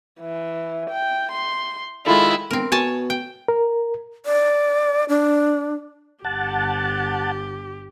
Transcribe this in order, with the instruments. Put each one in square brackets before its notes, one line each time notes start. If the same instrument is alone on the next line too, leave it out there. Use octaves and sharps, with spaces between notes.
[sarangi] E3
G5
C6
[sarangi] D#3 [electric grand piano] G#3 F4 A4 [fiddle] E4
[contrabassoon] E1 [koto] C4 A#4
[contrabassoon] B2 [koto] C#5 G#5 A5
[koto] G5
[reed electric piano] A#4
[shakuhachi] D5
D4
[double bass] G1 [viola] G4 [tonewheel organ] F#5 A5